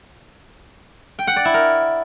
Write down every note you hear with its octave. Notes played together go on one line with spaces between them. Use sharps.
G5
F#5
D5
E4
A#4